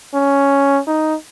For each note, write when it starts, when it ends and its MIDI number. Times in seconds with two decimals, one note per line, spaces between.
0.14 0.79 61
0.87 1.14 63